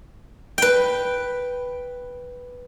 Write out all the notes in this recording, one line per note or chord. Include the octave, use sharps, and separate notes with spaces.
B4 G5